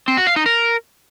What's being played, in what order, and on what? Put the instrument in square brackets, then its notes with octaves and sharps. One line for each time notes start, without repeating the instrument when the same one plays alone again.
[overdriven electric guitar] C4
F#4
F5
D#4
A#4